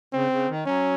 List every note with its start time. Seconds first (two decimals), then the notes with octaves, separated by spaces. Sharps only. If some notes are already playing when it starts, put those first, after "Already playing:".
0.13 C#3 C4
0.31 C#3
0.49 D#3
0.66 F#3 C#4